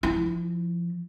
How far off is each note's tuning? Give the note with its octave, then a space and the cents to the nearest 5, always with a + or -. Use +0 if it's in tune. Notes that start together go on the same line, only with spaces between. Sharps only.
F3 -20 E4 +0